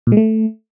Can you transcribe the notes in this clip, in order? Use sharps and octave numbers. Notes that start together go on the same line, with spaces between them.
A#2
G#3
A3